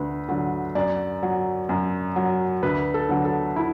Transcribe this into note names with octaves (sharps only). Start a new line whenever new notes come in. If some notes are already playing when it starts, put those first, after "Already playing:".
Already playing: D2 B4
D3 F#3
F#2 D5
F#3
F#2
F#3
D2 B4
A4
D3 F#3
A4
E4